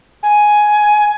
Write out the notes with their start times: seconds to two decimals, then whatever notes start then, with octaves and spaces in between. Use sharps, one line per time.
0.23 G#5